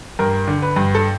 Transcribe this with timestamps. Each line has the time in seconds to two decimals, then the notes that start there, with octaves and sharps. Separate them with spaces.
0.19 G2 A#4
0.47 D3
0.62 B4
0.76 G2
0.95 A4